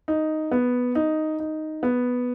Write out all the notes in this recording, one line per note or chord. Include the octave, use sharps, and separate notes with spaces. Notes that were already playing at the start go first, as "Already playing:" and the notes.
D#4
B3
D#4
D#4
B3